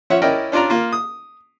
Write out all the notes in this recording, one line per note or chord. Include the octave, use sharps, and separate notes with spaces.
F3 C#4 C#5 E5 F#5
C#4 E4 A#4 D5 D#5 G5
C#4 D4 F4 D5 A#5
A#3 F4
D#6